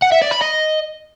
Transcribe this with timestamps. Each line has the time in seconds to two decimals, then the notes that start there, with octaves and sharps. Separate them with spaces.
0.02 F#5
0.12 E5
0.21 D5
0.31 B5
0.41 D#5